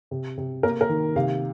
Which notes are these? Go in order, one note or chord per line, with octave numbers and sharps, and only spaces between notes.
C3
C3
A#3 A#4
A#4
D#3
C3 F5